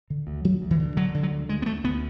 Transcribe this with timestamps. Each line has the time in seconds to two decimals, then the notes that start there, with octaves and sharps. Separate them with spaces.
0.10 D3
0.27 D2
0.45 D2 F#3
0.62 D2
0.71 E3
0.80 D3
0.97 D3 F#3
1.14 D3
1.23 F#3
1.31 D2
1.49 D2 G#3
1.62 B3
1.66 D2 A3
1.84 D2 B3